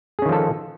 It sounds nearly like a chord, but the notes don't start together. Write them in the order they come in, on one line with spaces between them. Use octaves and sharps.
G#4 C#4 D#3 F3 A4